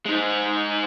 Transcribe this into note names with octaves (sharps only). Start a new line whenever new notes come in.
G#3 D#4